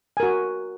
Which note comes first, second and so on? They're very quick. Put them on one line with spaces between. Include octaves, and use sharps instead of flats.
G#5 A#4 F#4